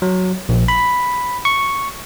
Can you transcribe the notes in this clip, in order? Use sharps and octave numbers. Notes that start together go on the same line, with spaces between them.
F#3
A#1
B5
C#6